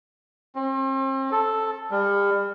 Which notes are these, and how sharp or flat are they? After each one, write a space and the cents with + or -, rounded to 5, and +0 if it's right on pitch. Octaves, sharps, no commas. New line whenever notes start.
C4 +40
A4 +0
G3 +35